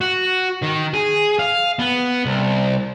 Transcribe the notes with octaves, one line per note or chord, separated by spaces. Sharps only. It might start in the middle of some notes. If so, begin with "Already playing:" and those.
F#4
D#3
G#4
F5
B3
C2